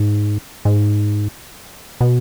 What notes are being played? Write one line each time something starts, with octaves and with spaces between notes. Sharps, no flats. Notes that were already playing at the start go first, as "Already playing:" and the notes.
Already playing: G#2
G#2
B2